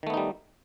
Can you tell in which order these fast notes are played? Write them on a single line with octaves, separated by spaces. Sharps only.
D#3 A3 B3 D#4 G3